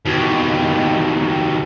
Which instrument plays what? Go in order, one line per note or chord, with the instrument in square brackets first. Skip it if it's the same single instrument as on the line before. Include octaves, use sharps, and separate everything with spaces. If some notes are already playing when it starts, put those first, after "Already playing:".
[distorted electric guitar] D#2 B2